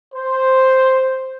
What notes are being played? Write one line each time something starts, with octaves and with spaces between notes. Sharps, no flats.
C5